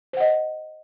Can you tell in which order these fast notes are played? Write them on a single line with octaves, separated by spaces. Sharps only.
C5 F#5 D#5